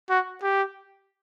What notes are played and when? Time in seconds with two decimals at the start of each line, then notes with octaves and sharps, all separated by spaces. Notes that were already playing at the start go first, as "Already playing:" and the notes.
0.10 F#4
0.43 G4